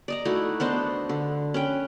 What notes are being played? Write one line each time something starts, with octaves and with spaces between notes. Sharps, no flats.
D5 D#5 A#5
A3 D#4 E4 F#4
B3 D4 C5 D#5
D3
C#4 B4 G5